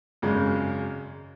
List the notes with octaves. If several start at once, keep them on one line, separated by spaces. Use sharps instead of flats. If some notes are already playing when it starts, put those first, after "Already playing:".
G#1 F#2 C#3 G#3